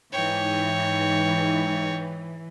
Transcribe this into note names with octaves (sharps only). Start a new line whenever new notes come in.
G#2 E3 D#4 C#5 G5